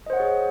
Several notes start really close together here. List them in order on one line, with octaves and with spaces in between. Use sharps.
D#5 C5 F#5 C#5 G#4